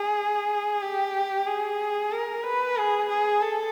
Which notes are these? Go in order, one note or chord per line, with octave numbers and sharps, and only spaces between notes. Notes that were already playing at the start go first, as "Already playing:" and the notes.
Already playing: G#4
G4
G#4
A#4
B4
G#4
G#4
A4